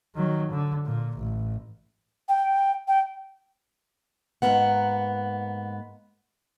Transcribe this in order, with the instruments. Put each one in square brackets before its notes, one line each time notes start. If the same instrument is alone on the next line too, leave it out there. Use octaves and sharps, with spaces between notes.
[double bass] D#3 F#3
D3
A#2
A1
[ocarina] G5
G5
[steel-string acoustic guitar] G#2 F3 A#3 B3 F#5